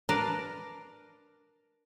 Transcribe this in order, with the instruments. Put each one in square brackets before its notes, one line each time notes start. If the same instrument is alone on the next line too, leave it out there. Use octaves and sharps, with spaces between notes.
[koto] D4 A#4 B4 D5 F5 A5